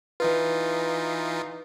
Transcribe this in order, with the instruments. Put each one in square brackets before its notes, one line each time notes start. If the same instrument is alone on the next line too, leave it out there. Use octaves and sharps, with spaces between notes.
[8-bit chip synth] E3 D#4 F4 [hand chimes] B4